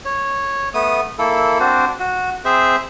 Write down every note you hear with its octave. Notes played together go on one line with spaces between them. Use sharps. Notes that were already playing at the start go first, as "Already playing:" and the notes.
C#5
A3 B3 D#6
A#3 E4 A4
C4 D4 F#4 C5
F#4
C4 G#4 C5 E5